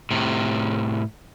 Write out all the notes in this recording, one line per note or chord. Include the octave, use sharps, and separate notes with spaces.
A2 C3